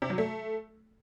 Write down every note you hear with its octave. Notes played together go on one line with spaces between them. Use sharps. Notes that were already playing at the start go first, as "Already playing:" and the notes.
C3
F#3
A3